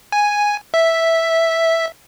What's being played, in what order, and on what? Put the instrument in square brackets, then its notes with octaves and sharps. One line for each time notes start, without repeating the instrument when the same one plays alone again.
[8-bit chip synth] G#5
E5